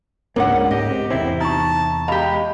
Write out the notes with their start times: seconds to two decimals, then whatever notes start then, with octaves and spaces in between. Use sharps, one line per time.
0.36 C#2 G#2 A#3 C#4 D4 A#4 F#5
0.71 G#2 G4 D#5
0.91 C4
1.10 E2 C3 C4 E4
1.40 D#4 A5 A#5 C#6
2.08 G#3 G4 D#5 F5 A#5 B5